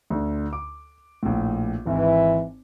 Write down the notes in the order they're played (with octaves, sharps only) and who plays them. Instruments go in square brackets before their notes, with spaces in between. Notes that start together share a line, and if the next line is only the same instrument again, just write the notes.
[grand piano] D2 D3
D6
A#1 A2
[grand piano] G#1 [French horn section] E3